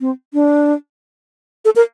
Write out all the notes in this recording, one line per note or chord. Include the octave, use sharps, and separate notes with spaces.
C4
D4
A4
A#4